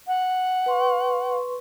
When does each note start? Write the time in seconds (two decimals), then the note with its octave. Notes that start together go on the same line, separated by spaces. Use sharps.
0.07 F#5
0.66 B4 C6 C#6